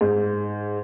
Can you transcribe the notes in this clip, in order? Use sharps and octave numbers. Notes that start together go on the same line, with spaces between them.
G#2